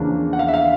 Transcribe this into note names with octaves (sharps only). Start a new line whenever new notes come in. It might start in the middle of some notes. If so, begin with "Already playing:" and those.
Already playing: E2 C#3 F3 A#3 D4
F#5
F5
E5
F5